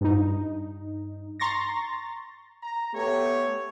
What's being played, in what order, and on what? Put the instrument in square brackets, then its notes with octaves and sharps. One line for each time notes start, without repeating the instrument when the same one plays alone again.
[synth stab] G2 D#4
A#5 C6 C#6 A6 A#6
[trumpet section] A#5
[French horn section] A3 B3 G4 [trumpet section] C#5